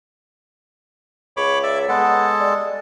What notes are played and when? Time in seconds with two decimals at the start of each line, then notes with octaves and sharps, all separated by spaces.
1.37 C#2 C#5 B5 D6
1.63 D5 E5
1.88 G#3 B3 A4
2.40 G3